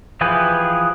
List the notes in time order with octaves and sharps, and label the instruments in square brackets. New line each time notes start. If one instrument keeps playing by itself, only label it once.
[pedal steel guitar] E3 F3 G4 G#4 B4